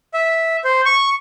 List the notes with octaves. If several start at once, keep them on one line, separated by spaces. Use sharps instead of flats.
E5
C5
C#6